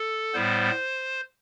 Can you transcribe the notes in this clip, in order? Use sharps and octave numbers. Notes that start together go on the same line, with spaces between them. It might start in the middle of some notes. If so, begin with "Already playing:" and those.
Already playing: A4
A2 G3 B3 C5